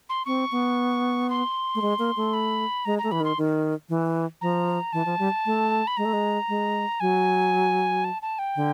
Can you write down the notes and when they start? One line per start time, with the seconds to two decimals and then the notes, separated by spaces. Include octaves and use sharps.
0.09 C6
0.25 C4 C#6
0.52 B3
1.30 C6
1.75 A3
1.82 G#3
1.99 A#3
2.17 A3
2.34 B5
2.85 G#3 A#5
2.99 A3 A#5
3.11 E3 B5
3.20 D#3 C6
3.38 D#3
3.89 E3
4.41 F3 A#5
4.93 E3 A5
5.06 F3
5.19 G3
5.46 A3
5.87 B5
5.97 G#3 A#5
6.05 A3
6.13 G#3
6.49 G#3
7.00 F#3 G#5
8.04 A5
8.22 A5
8.39 G5
8.56 D3